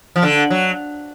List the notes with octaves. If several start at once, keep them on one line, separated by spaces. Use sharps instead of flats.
F3
D3
F#3